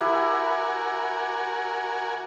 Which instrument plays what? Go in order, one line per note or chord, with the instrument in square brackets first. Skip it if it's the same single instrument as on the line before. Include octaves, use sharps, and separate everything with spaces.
[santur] E4 G4 B4 [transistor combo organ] F#4 A#4 G#5